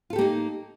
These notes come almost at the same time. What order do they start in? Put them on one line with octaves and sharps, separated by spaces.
F4 A4 G4 A#3 D#4